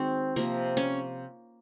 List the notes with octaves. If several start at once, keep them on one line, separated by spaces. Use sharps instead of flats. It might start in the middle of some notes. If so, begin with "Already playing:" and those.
Already playing: D#3 G#3 C4 F#4
C3 F3 A#3
C#4